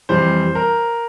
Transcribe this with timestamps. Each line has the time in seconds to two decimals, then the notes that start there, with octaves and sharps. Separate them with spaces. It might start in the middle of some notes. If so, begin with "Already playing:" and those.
0.09 F2 E3 G3 C5
0.55 A#4